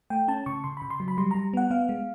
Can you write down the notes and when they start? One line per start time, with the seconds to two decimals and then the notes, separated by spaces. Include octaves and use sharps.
0.10 A3 G5
0.28 C#4 A5
0.46 C#3 C#6
0.64 C#3 C6
0.77 C#3 B5
0.90 C6
1.00 F#3
1.08 B5
1.17 G3 C6
1.31 G3 A#5
1.54 B3 F#5
1.71 B3 F5
1.89 G#3